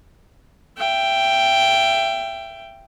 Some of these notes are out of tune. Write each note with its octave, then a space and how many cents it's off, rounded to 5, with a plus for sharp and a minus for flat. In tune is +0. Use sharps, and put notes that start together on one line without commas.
E5 +30 G5 +0